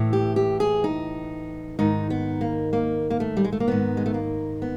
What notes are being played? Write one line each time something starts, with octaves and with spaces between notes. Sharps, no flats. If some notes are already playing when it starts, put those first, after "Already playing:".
Already playing: A2 E3
G4
G4
G#4
D#4
G#2 D#3 D#4
B3
A#3
A#3
A#3
A3
G3
G#3
A3
A#3
G#2 D#3 B3
G#3
A3
A#3
B3